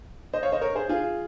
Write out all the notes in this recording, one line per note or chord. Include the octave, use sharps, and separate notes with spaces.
C5 D#5
C#5 F5
C5 D#5
A#4 C#5
G#4 C5
F4 G#4